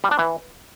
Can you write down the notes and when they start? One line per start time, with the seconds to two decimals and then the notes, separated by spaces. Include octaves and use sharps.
0.04 G3
0.11 D4
0.19 E3